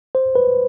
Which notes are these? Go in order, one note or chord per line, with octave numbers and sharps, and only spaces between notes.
C5
B4